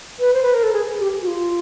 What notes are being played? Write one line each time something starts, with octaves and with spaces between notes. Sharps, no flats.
B4
C5
B4
A#4
A4
G#4
G4
F#4
F4